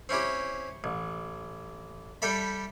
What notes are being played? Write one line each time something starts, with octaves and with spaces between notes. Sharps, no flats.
C4 C#4 E4 G4
A1
G3 G4 A4 E5 B5